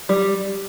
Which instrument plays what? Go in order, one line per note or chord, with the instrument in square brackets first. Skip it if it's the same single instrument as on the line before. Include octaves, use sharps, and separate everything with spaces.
[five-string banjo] G3